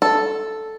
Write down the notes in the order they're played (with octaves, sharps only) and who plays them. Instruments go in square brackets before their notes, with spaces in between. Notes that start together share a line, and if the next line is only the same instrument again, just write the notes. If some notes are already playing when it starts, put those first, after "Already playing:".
[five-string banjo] A4